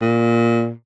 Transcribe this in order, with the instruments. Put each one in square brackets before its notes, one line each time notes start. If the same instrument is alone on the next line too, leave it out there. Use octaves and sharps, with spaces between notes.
[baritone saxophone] A#2